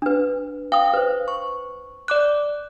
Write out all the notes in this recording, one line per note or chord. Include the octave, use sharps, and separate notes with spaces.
D4 B4
F5 G5 D#6
B4 C5
C#6
D5 D6 F#6